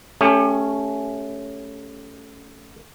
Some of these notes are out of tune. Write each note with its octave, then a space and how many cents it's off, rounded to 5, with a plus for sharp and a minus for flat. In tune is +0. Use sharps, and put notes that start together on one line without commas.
A3 +0 C#4 +5 G4 +35